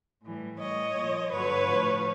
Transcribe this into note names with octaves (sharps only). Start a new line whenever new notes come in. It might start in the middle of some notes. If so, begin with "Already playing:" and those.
A2 E3 G3
A2 E3 G3 C#5 D#5
A#2 F3
G2 D3 F#3 B4 C#5
A2 F3